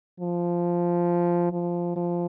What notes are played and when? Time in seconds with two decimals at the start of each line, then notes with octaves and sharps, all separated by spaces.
0.20 F3
1.52 F3
1.96 F3